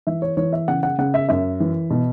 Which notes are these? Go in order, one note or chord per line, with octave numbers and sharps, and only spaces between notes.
E3 E5
C#5
E3 C#5
E5
C#3 F#5
F#5
C#3 F#5
E5
F#2 E5
E3
B2